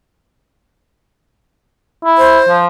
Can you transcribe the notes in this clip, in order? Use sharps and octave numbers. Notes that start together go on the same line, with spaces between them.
E4
C5
F3